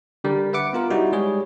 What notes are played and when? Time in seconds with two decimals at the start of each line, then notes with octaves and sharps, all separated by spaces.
0.24 D3 G3 A#4
0.53 B4 E5 F#5 D6 C#7
0.73 B3 F4 A#4
0.90 G3 D#4 E4 F#4
1.12 G3 G#3 G#4 C#5